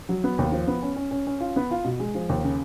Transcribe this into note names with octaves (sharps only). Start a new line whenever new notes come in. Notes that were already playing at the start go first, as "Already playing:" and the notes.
F#3
B3
D#2
F3
B3
C#4
C#4
C#4
C#4
F4
B3
F4
B2
G#3
F3
D#2
C#3